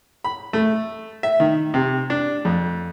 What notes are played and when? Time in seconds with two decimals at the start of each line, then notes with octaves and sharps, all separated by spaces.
0.24 B5
0.53 A3
1.23 E5
1.40 D#3
1.74 C3
2.10 D4
2.45 F2